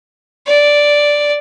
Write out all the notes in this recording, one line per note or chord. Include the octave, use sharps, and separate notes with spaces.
D5